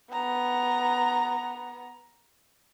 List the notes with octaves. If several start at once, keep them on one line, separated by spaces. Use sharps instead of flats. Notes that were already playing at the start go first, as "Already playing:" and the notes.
B3 A#5